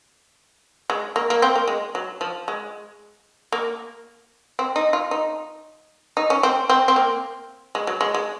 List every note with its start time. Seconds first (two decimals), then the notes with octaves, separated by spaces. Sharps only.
0.90 G#3
1.16 A#3
1.30 A#3
1.42 C4
1.56 A#3
1.68 G#3
1.95 F#3
2.21 F3
2.48 G#3
3.52 A#3
4.59 C4
4.76 D#4
4.93 F4
5.11 D#4
6.17 D#4
6.30 C#4
6.43 C4
6.69 C4
6.88 C4
6.96 A#3
7.75 G#3
7.87 F#3
8.01 G#3
8.14 G#3